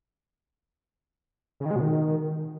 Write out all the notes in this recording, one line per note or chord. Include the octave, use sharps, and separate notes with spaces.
C#3
D#3
G#3
B2
D#3